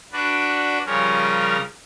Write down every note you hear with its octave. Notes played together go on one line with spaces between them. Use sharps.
D4 F#4 B4 D5
C#3 F3 G3 C#4 A#4